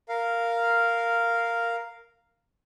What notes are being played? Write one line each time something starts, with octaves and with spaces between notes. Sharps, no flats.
A#4 F5